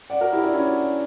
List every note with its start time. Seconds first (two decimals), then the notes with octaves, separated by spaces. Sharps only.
0.10 D5 F#5
0.20 F#4 A#4
0.32 E4 G4
0.43 D4 F#4
0.54 C#4 E4